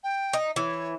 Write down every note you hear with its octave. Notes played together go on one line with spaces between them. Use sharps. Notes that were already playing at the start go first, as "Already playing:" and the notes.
G5
D#4
E3 C#5